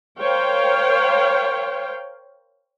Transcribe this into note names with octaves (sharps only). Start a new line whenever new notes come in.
A#4 C5 C#5 F5 G5